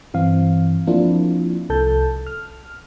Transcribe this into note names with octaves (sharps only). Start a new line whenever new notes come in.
G2 E3 C4 F5
F3 A#3 C4 D4 E4 F4
C2 A4 A5 G6
F6